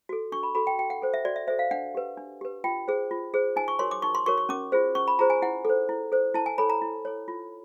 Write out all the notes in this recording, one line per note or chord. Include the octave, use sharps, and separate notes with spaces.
F#4 A4
D4 C#6
B5
F#4 A4 B5
G5
F#4 G5
F#5
A4 C5
E5
F#4 D5
E5
A4 C5 E5
F5
D4 F#5
G4 B4
D4
G4 B4
F4 G5
G#4 C5
F4
G#4 C5
D#4 G#5
C#6
F#4 A#4 C#5 C6
D6
D#4 C#6
C6
F#4 A#4 C#5 C#6
C#6
C#4 D6
F4 G#4 C5
C#4 C#6
B5
F4 G#4 C5 A#5
G#5
E4 F#5
A4 C5
E4
A4 C5
E4 A5
G#5
A4 C#5 B5
A#5
E4
A4 C#5
F4